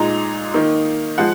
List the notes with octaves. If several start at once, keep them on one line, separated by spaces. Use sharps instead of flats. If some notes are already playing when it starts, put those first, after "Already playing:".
Already playing: A#2 G#3 D#4 A#5
D#3 A#3 D#4
F3 G#3 F#5